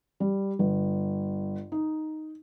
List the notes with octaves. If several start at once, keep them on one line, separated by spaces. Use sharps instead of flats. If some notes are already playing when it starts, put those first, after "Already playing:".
G3
G1
D#4